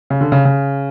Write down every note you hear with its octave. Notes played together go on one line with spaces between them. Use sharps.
C#3
D3
C#3
C#3